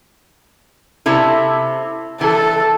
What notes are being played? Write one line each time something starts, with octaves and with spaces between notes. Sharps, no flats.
C3 E4 A4
E3 A4